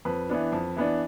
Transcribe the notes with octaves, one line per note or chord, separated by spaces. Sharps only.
F2 B4
E3 B3 D4
F2
E3 B3 D4